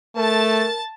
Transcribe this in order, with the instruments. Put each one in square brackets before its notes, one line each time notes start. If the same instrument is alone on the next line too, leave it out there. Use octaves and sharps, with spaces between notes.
[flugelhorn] A3 [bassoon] A#4 [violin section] A5 A6